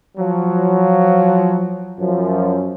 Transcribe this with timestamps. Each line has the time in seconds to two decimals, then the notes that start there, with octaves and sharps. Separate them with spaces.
0.18 F3 F#3
1.99 F#2 F3